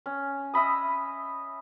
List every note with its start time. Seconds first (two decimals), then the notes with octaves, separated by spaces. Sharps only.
0.06 C#4
0.54 D#5 E5 B5 D#6